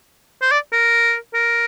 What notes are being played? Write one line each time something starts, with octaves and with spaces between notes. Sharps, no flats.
C5
D5
A#4
A#4